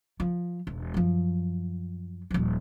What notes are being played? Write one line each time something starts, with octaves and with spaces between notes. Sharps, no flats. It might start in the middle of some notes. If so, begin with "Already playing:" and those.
F3
E1
F#2 F3
D#1 F3